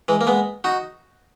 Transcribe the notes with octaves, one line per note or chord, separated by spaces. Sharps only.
E3 G#3
A#3
G#3 B3
D#4 F#4